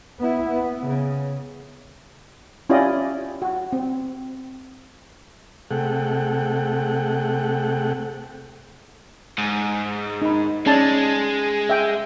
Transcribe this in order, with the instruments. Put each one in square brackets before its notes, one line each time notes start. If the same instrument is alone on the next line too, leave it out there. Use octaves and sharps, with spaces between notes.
[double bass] B3 E4
B3
C#3
[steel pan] C#4 E4 F4 G4 D5 D#5
F#4
C4
[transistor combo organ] C3 A3 G#4 A4 F#5 G5
[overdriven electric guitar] G#2
[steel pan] D#4 B5
[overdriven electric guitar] G#3 [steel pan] C#4 D5 A5
[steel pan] E5 G5